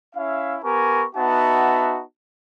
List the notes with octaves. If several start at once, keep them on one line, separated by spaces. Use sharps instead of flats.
C#4 E4 E5 F5
B3 G4 A#4 G#5 A#5 C#6
B3 D#4 F#4 E5 F#5 A5